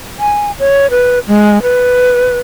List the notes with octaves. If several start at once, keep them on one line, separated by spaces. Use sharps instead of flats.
G#5
C#5
B4
G#3
B4